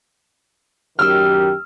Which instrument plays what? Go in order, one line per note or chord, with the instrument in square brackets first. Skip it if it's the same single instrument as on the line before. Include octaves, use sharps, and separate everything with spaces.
[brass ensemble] F#2 D#3 G4 [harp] E6 F6